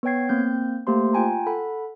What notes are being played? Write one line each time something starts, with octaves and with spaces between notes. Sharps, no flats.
B3 B4 C#5 G5 G#6 C7
A#3 C4 G6
A3 A#3 G4 C5 C6
F4 G5 G#5 A#5
A4 F#5 B5